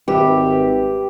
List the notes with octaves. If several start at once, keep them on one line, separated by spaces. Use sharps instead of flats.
G#1 G4 B4 E5